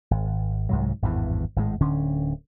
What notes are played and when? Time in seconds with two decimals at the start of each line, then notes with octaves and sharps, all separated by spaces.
0.11 G#1
0.69 C2 G#2 F#3
1.02 G#1 E2 G2 E3
1.56 G#1 A2 G#3
1.81 D1 D3 C#4